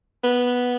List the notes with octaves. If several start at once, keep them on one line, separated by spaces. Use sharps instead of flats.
B3